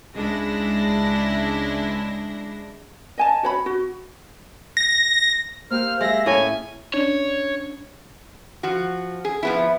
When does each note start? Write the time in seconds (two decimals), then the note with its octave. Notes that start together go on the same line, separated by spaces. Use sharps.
0.16 C#2 G#3 D4 E4 A#6
3.18 D#5 G#5 A5
3.43 F#4 C#5 B5
3.66 F#4
4.77 A#6
5.71 A#3 G4 C5 E6 F6
6.01 G#3 G4 E5 E6 A#6
6.26 A2 C#4 G#5
6.94 C#4 D4 C#5
8.63 F3 F#4
9.25 G#4
9.43 F3 B3 E4